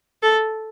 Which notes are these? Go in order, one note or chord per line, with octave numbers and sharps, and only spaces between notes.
A4